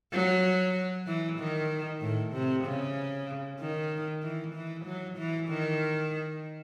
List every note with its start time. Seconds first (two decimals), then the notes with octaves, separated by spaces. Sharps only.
0.13 F#3
1.07 E3
1.39 D#3
2.01 A2
2.33 C3
2.64 C#3
3.59 D#3
4.22 E3
4.54 E3
4.85 F#3
5.17 E3
5.48 D#3